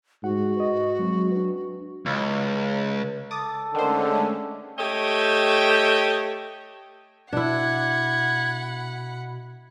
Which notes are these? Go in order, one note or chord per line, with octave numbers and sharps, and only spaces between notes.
G#2 F#4 F#5
B4 D#5
F#3 G#3 C4
D4 B4
C#2
A4 D6 D#6 A6
D3 D#3 G#3 A3 C#4 C5
A3 G4 C#5 D#5 G5
B2 D4 E4 F#5 B5 G#6